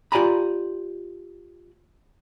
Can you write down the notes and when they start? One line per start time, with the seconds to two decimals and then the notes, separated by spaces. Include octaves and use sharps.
0.12 F4 G4 D5 G#5 A#5 B5